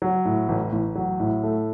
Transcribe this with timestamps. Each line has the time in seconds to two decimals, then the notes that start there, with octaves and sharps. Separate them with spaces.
0.02 F#3
0.25 A2
0.48 A1
0.72 A1
0.95 F#3
1.20 A2
1.44 A3